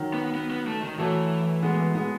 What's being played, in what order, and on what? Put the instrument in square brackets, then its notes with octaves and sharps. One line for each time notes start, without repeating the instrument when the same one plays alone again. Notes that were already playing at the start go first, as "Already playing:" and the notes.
Already playing: [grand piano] D#3 F#3
[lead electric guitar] B3
B3
B3
A3
D#3
[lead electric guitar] E3 [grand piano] F#3 A3
[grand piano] G#3 B3
G#3 B3